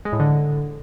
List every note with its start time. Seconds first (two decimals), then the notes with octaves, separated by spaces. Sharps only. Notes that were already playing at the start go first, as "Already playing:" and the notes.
0.05 G#3
0.13 A2
0.20 D3